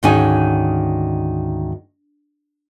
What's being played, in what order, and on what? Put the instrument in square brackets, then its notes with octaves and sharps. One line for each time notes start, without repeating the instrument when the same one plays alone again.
[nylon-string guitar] D2 G#2 D#3 C#4 D#4 G#5